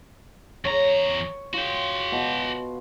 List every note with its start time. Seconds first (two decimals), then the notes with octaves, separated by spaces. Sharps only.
0.65 E2 C#5 A#5
1.54 F4 F#4 G5
2.12 B2